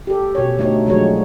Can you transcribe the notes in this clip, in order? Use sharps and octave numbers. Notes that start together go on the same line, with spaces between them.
G4 A4
B2 C#5
D3 A3 D#4 C#5
D3 F3 F#3 G#3 C#5